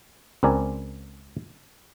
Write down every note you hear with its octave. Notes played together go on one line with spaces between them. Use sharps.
C#2 C4 A#4 D5 G#5